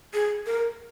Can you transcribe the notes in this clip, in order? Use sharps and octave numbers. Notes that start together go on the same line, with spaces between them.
G#4
A#4